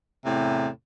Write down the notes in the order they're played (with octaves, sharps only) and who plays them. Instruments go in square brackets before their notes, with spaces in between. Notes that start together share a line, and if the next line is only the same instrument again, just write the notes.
[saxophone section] E2 A2 C3